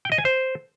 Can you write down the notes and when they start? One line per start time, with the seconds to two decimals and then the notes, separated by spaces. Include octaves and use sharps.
0.05 G5
0.12 D#5
0.18 G#5
0.25 C5